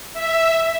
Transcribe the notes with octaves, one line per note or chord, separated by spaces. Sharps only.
E5